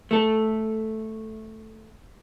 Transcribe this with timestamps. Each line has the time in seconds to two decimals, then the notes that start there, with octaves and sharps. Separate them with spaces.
0.11 A3 A4